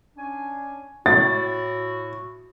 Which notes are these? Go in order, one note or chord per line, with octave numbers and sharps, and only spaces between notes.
C#4 D4 G#5
A2 E4 F#4 A6